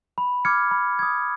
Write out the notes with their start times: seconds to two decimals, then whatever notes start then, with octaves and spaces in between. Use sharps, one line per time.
0.18 B5
0.45 D6 F6 G#6 C#7
0.71 B5
0.99 D#6 G#6